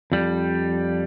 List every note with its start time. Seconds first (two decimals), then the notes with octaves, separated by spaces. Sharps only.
0.12 F2 G3